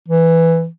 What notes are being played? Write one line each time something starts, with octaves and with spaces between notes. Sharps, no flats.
E3